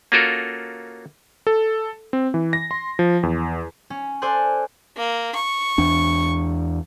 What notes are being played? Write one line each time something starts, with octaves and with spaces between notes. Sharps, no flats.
A#3 C#4 F4 F#4 A4 A#4
A4
C4
E3
A#6
C6
F3
E2
C#4
A4 C5 D5 G#5 C6 F#6
A#3
C#6
E2 D4